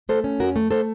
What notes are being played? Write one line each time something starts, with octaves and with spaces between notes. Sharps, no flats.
A3 A4 C5
C#4
F2 F#4 A#4
A3
A3 A4 C5